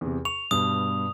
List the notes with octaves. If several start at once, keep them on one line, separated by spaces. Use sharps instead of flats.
E2 C3
C#6 F7
G2 B2 D#6